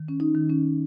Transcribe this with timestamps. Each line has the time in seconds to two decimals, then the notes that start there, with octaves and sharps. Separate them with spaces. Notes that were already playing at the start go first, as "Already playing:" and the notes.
Already playing: D#3
0.08 C#4
0.20 D#4
0.35 D#3
0.50 C#4